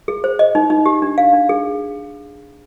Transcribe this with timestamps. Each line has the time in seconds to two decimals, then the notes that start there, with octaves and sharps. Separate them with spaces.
0.08 G#4
0.24 C5
0.39 D#5
0.55 D#4
0.70 D#4
0.86 G4
1.02 D4
1.18 F5
1.33 D4
1.49 G#4